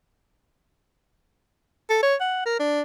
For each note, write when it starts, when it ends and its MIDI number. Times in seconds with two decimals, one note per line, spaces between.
1.90 1.98 69
2.03 2.15 73
2.20 2.41 78
2.46 2.55 70
2.59 2.82 62